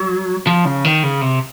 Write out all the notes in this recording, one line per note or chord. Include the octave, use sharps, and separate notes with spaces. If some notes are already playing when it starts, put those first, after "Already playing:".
Already playing: F#3
F3
C#3
D#3
C#3
C3